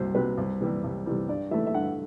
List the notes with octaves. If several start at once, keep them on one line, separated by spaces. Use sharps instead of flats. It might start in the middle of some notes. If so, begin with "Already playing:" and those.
Already playing: C2 F#3 C5
C3 F#3 B4
C2
C3 E3 G3
C2
C3 E3 G3
G2 D5
E3 A3 E5
E5
G2 F#5